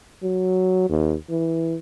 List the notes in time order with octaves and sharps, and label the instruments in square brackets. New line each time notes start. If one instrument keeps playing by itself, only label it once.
[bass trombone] F#3
D#2
E3